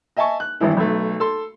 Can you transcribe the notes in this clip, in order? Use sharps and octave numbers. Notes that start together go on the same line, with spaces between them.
D#5 E5 G#5 A5 C#6
F#6
G#1 G2 E3 E4
B1 A3
A4 C6